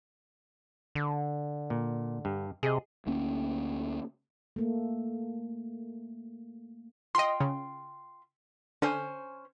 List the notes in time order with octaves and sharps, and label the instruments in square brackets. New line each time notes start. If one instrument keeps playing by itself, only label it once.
[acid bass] D3
[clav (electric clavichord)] A#2
G2
[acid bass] C3 [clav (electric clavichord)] G#4 D#5
[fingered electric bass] D2 A#3 C#4
[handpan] A3 A#3
[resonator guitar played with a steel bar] F4 G5 [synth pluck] D#5 C6
[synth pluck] C#3
[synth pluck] D3 [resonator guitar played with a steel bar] C#4 C5 G#5